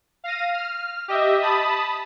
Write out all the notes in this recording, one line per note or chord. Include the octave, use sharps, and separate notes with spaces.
F5 A#6 D#7
F6
G4 D#5 E5
A5 B5 D#6